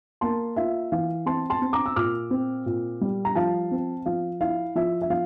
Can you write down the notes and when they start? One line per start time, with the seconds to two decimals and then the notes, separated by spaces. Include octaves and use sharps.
0.21 A#3 A5 C6
0.56 F4 E5
0.92 E3 F5
1.26 C4 A5 C6
1.50 A5 C6
1.62 C4
1.73 A#5 D6
1.86 E6
1.96 A#2 D6 F6
2.31 C4
2.66 A#2
3.01 G3
3.25 A#5
3.35 F3 F5 A5
3.71 C4
4.06 F3 F5
4.41 E4 F5
4.75 F3 E5
5.02 E5
5.10 F3 F5